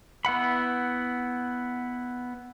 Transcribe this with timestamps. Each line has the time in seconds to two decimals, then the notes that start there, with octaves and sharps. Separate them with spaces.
0.25 B3 E4 F#5 B5